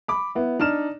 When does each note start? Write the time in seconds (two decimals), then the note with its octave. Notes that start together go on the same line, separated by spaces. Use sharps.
0.08 B5 D6
0.35 B3 E4
0.60 D4 D#4 F6 E7